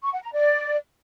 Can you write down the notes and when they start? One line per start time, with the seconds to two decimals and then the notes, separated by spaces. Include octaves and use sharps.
0.03 C#6
0.13 F#5
0.23 A#5
0.33 D5